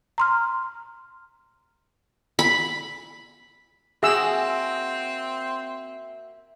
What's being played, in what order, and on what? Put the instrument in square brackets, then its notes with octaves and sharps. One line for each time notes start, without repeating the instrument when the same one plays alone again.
[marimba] A#5 C6 F6
[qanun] B5
[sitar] A#3 F#4 [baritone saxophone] C4 [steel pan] G#4 E6 [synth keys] E5